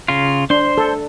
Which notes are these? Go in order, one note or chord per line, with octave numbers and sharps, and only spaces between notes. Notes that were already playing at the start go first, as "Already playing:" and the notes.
C#3 F4
D4 C5 C6
A4